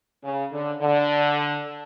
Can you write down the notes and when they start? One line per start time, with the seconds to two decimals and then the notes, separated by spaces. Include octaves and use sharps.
0.24 C#3
0.53 D3
0.81 D3